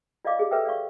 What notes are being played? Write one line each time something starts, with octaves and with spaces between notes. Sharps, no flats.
F4 D5 D#5 F5 D6
G4 G#4
A4 B4 C#5 E5 G5 E6
D5 F5 C#6